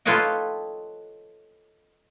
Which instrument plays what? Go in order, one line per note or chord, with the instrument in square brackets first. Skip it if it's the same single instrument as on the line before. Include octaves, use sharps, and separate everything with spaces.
[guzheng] F4 A4 B4 C#5 D#5 G5